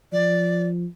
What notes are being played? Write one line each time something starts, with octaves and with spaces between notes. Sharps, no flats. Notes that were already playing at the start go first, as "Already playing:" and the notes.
F3 D5